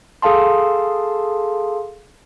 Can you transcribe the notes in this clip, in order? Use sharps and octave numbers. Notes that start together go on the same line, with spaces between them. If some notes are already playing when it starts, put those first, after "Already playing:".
G#4 A4 F5 A5 C6